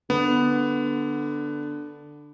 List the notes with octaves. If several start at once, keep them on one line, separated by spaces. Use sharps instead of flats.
D3 B3